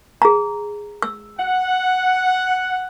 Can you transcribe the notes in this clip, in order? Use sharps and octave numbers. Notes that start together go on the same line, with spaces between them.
G#4 A#5
E6
F#5